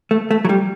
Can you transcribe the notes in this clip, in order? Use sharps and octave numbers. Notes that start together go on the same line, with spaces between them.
A3
A3
F#3
G3